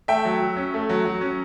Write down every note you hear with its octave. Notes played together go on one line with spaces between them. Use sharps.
A3 E5 G5
F#3
F#3
C#4
A3
F#3
F#3
C#4